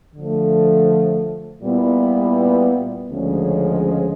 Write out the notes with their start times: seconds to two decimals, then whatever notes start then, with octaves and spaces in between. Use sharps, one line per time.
0.16 D3 F3 A3
1.62 A#2 G3 B3 E4
3.09 D2 C#3 F3 G#3 C#4